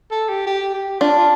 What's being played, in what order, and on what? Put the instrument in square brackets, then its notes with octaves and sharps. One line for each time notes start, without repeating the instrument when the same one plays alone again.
[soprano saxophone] A4
G4
G4
G4
[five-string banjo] D4 [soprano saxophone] F4
[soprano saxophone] F4